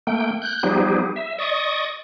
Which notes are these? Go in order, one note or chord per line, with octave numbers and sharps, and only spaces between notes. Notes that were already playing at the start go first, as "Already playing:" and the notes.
A3 A#3 G5
F#6 G6
F3 G3 B3 D#4 G4 G#4
E5
D5 D#5 C#6 D#6